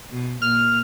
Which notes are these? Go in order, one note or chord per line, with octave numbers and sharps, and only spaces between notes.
B2
A#2 A#3 F6